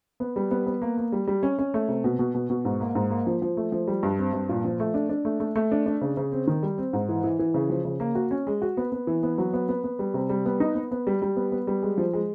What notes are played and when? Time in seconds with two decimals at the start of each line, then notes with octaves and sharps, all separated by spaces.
0.20 B3
0.36 G3
0.51 B3
0.67 B3
0.82 A#3
0.98 A#3
1.12 G3
1.27 G3
1.43 C#4
1.59 C#4
1.74 A3
1.89 C3
2.04 B2
2.19 B2
2.35 B2
2.50 B2
2.65 G#2
2.81 A#3
2.95 G#2
3.11 A#3
3.27 F3
3.42 F3
3.57 A3
3.72 F3
3.88 G3
4.03 G2
4.19 C4
4.33 G2
4.49 A#2
4.64 F3
4.80 A3
4.94 D4
5.09 D4
5.25 A3
5.40 A3
5.56 A3
5.72 D4
5.86 D4
6.02 C#3
6.17 C#3
6.32 C4
6.47 D#3
6.63 G3
6.78 C4
6.93 G#2
7.09 E3
7.24 E3
7.39 E3
7.54 C#3
7.70 F3
7.85 C#3
8.00 A#3
8.15 F#4
8.31 C#4
8.47 G#3
8.62 F#4
8.77 B3
8.92 B3
9.07 E3
9.23 B3
9.38 F#3
9.53 B3
9.69 B3
9.84 B3
9.99 G3
10.14 C3
10.29 G3
10.46 B3
10.60 D#4
10.75 B3
10.91 B3
11.07 G3
11.22 G3
11.36 B3
11.52 B3
11.67 G3
11.83 G#3
11.98 F3
12.13 G#3